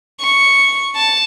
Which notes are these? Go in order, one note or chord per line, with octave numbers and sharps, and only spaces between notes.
C#6
A5